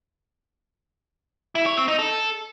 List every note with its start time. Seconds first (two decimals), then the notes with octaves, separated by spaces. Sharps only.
1.55 E4
1.66 C#5
1.77 C4
1.88 D#4
1.99 A4